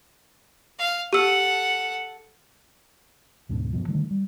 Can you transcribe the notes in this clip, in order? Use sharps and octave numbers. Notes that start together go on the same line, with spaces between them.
F5
G4 A4 F#5 E6 F6
D2 G#2 B2 D3
F#2 B2 F3
D3 D#3 G3 A3
G3